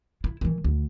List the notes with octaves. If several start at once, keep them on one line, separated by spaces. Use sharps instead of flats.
E4
D#3 E3
D2